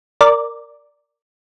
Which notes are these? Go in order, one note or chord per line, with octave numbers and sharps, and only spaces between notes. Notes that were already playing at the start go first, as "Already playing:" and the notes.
A#4 D5